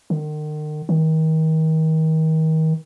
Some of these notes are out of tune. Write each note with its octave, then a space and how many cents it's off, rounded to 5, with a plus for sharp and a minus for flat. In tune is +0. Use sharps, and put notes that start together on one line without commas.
D#3 -40
D#3 +35